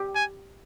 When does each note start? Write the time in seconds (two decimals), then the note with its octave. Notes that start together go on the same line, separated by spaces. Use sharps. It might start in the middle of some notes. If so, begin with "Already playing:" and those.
Already playing: G4
0.16 G#5